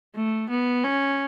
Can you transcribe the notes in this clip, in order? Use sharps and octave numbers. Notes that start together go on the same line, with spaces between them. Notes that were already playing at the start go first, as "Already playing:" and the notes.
A3
B3
C#4